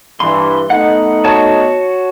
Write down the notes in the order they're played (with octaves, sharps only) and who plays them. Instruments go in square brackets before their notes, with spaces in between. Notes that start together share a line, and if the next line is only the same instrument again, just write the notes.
[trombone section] G2 E3 [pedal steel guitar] C6
[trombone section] A3 B3 D#4 [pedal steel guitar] F#5
[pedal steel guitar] F#4 C#5 A5